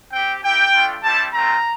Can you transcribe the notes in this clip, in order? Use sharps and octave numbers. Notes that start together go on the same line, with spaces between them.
C4 G4 G5
A#3 E4 G4 G5
A3 D4 F4
G3 C4 E4 G4 A5
A3 C4 F4 A#5